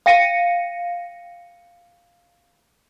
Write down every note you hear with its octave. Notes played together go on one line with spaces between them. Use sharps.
F5 G5 A#6 C#7 D#7